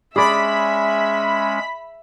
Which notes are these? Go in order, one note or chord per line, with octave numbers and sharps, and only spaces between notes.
G#3 C#4 G#4 D5 E5 B5 B6